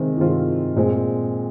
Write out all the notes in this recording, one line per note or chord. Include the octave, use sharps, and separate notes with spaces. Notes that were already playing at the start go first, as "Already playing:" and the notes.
Already playing: C3 D#3 G#3 C4
C3 D#3 G#3 C4 F4
A#2 G#3 C4